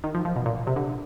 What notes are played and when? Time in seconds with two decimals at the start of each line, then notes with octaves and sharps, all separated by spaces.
0.04 D#3
0.15 F3
0.25 F3
0.36 B2
0.46 A#2
0.67 C3
0.76 D3